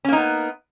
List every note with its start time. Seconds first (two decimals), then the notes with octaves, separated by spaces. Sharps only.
0.05 C#4
0.09 A#3
0.13 D#4
0.17 B3